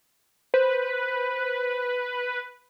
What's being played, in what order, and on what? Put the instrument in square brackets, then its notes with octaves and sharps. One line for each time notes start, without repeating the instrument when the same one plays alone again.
[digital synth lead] B4 [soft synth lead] C5